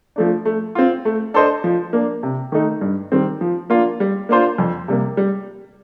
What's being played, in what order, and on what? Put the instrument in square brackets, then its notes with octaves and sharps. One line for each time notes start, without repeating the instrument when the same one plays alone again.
[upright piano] F3 A3 D4
A3
C4 F4
A3
D4 A4 C5 D#5
F3
A#3 D4
C3
D#3 A3 D#4
G2
D#3 G3 C4
F3
A#3 D4 F4
G3
A#3 D4 F4 C5
F2
C3 G3 A#3
G3